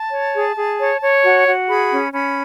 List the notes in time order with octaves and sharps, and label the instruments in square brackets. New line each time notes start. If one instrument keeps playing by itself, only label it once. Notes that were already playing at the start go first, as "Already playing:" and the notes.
Already playing: [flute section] A5
C#5
G#4
G#4
C#5
C#5
F#4
F#4
G#4 B5
C#4
C#4 B5